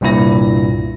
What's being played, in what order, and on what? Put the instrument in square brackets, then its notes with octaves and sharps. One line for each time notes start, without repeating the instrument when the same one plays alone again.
[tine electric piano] C2 G2 A#2 E4 A#6